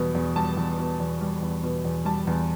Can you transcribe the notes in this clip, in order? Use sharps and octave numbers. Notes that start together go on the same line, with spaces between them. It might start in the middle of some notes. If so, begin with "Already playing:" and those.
Already playing: E2 B2 G3
E2
G3 A5
E2
B2
E2
G3
E2
B2
E2
G3 A5
E2